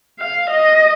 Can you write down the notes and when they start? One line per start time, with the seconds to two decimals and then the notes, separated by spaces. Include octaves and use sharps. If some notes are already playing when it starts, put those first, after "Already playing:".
0.19 F5
0.50 D#5